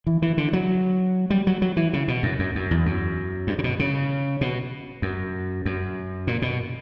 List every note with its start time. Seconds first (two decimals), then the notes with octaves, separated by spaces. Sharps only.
0.07 E3
0.22 E3
0.38 D3
0.53 F#3
1.30 G3
1.47 F#3
1.62 F#3
1.77 E3
1.93 C#3
2.08 B2
2.23 F#2
2.39 F#2
2.55 F#2
2.71 E2
2.86 F#2
3.47 G2
3.59 C#3
3.64 B2
3.79 C#3
4.41 B2
5.02 F#2
5.65 F#2
6.27 A#2
6.42 B2